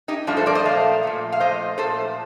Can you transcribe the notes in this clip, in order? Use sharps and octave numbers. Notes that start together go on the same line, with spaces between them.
D#4 G4
G2 F3 A3 D4 F4
A4 C5
A#4 D5
C5 D#5
A#2 F3 A3 F5
A#2 F3 A3
F5
A#2 F3 A3 C5 D#5
A#2 F3 A3 A4 C5